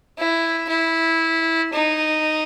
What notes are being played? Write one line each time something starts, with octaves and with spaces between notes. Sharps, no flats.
E4
E4
D#4